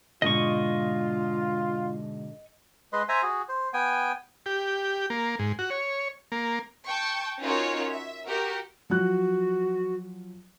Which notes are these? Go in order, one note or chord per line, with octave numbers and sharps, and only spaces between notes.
G#2 B2 D3 F4 D#5 A5 C#6 D#6
G#3 B4 D#5 C6
C5 E5 G#5 A#5
F#4 G#4
C5
B3 G5 G#5
G4
A#3
G#2
F#4
C#5
A#3
G5 A5 C#6
C#4 D#4 F4 F#4 A#4 C#5
E5
F#4 G4 A#4
F3 F#3 F#4 F#6